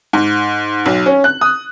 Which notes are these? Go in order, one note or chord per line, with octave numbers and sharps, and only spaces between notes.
G#2
B1
C#4
F#6
D#6